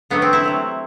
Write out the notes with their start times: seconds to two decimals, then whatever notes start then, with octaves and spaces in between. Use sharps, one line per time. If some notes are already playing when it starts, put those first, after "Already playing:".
0.10 D3 F#3 A3 B3
0.22 C4
0.33 E4
0.44 C3 F#3 A3